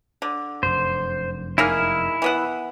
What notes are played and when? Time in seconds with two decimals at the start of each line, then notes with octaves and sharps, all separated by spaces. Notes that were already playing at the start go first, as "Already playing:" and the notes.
0.22 D3
0.63 F1 F#2 C5
1.58 A#3 D#4 E4 G#4 F6
2.22 E3 B3 F#5